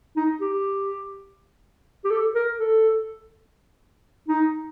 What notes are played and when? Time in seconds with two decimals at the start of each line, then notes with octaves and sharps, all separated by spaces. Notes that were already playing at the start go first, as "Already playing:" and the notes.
0.17 D#4
0.41 G4
2.05 G4
2.10 A4
2.35 A#4
2.59 A4
4.28 D#4